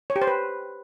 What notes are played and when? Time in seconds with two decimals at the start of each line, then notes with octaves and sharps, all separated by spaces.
0.10 C#5
0.16 G4
0.22 C5
0.27 B4